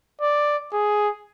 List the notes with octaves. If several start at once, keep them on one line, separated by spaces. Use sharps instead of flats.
D5
G#4